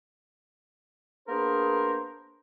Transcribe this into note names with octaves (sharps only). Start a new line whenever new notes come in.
A#3 B3 D4 G#4 A#4 C5